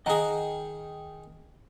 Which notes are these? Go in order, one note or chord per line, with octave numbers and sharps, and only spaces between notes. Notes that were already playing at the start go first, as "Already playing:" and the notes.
D#3 G#4 D#5 F#5 A#5